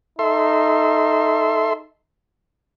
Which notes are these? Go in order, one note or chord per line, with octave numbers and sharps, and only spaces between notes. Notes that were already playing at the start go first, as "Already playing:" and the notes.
D#4 A4 E5 C6